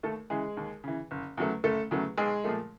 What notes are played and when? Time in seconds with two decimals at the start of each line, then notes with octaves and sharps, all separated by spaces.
0.03 D#2 A3 A4
0.30 C#3 E3 G#3 G#4
0.57 D#2
0.84 C#3 E3
1.11 F#1
1.37 E2 C#3 F#3 A3
1.64 F#1 A3 A4
1.91 E2 C#3 F#3 A3
2.17 B1 G#3 G#4
2.44 A#2 F3 A3